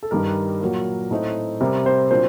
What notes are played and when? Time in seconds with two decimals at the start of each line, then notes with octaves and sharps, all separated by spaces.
0.03 A4
0.11 G2 D#3 G3 A#4
0.61 A#2 F#3 A#3
1.11 A2 A3 C4 D#4
1.61 C3 G3 C4 A#4
1.86 C4 C5
2.11 A#2 F#3 A#3 C4 D4 C5